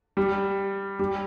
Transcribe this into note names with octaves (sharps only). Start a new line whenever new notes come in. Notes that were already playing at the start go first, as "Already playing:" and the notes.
G3
G3